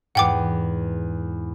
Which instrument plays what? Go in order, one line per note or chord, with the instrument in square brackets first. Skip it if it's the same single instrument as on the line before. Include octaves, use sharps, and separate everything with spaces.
[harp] E2 G#2 [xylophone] F#5 G5 D6